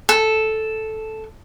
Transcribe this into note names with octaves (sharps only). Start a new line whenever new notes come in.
A4